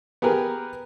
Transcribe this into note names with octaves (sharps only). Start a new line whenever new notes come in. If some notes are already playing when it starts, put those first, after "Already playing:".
B3 G4 G#4 A#4 B4